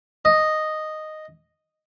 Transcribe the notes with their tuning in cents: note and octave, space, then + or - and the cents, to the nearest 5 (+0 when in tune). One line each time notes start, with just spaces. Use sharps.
D#5 -5